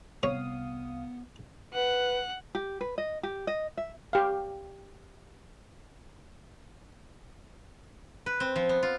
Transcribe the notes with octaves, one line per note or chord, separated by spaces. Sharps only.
C2 B3 C#5 F5 D#6
B4 F#5
G4
B4
D#5
G4
D#5
E5
G4 F5
B4
C4
F3
B3
F4